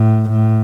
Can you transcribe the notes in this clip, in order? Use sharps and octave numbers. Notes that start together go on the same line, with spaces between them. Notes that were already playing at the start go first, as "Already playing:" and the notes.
Already playing: A2
A2